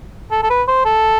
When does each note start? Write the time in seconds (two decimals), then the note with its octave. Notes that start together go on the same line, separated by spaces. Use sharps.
0.31 A4
0.43 A4
0.50 B4
0.68 C5
0.85 A4